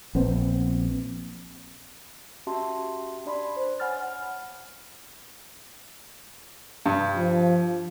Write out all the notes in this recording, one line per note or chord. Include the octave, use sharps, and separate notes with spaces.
A#1 B3 C4
C#4 F#4 G4 E5 A5 C6
D4 D5 B5 C6
C5
C#5 F#5 G#5 B5 F6 A6
G2
F3